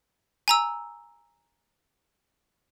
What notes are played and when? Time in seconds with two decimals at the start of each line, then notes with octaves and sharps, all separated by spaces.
0.48 G#5 A#5 E6